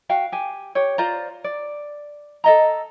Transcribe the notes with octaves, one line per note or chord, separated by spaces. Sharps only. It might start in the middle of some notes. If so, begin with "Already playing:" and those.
F#4 F5 G5
G4 G#5
G4 C#5
F4 C5 D5 A#5
D5
A4 D#5 A#5